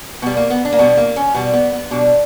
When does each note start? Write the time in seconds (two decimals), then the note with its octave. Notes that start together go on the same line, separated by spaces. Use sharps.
0.22 B2 G3 B3
0.37 A#3
0.50 B3
0.65 D4
0.72 A#3
0.79 B2 G3 B3
0.97 A#3
1.16 C#4
1.34 B2 G3 B3
1.53 B3
1.72 B3
1.91 B2 G3 D4